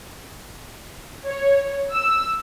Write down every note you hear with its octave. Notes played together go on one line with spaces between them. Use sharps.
C#5
E6